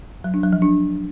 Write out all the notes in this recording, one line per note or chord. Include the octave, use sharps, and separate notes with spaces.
F#3
D4
F#3
F3
D4